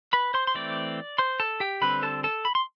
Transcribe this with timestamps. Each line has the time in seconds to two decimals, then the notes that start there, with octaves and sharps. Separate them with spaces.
0.13 B4 B5
0.34 C5 C6
0.47 C6
0.55 E3 A3 C4 D5 D6
1.18 C5 C6
1.40 A4 A5
1.60 G4 G5
1.81 D3 G3 C4 B4 B5
2.03 A4 A5
2.24 A4 A5
2.45 B5
2.55 C6